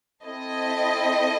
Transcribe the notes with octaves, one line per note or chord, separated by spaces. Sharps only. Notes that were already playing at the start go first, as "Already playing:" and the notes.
C4 E4 A4 D#5